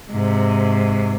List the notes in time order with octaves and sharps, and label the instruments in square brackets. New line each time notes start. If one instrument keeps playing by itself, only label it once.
[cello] G#2 C3